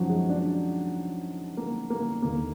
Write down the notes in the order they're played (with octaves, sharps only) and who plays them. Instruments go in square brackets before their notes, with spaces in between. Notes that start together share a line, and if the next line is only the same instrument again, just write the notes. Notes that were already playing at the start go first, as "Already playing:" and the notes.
Already playing: [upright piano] F#2 D#3 F3 F#3
G#3
D4
A#3
A#3
D#2 D3 A#3